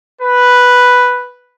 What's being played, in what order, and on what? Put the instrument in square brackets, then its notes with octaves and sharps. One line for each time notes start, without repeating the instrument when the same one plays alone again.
[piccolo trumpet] B4